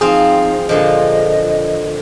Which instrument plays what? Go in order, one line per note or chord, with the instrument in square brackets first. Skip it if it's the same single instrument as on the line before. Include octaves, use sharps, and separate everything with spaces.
[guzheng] F3 C4 F4 [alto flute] D#4 [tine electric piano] G#4
[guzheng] A#2 D3 F3 [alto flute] D#5